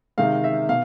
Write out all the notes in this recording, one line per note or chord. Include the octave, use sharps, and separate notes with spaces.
C3 D#3 G#3 F5
E5
B2 F5